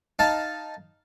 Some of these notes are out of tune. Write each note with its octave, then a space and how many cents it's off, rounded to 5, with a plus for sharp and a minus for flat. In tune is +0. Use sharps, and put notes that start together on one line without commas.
D#4 +0 F5 +0 A5 +0